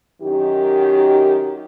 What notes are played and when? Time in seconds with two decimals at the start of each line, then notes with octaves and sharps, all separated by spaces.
0.22 F#2 D#3 D#4 G4